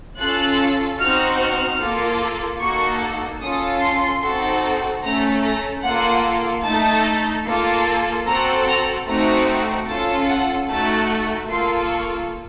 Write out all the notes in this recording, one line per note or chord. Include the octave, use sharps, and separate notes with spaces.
C#4 F4 A4 F#6
C4 D#4 F#4 F6
F6
A#3 F4 A4
A#3 D#4 F#4 A4 C#6
C#4 F4 A4 D#6
C6
C4 D#4 F#4 A4
A3 C#4 A4 A#5
A#5
A#3 F4 A4 F#5
A3 D#4 A4 A5
A#3 F4 A4
C4 F#4 A4 A#5
A#5
A3 C4 D#4 F#4 A#5
C#4 F4 A4 A5
F#5
A3 D#4 F#4 A4 A5
A#3 F4 A4 C6
C#6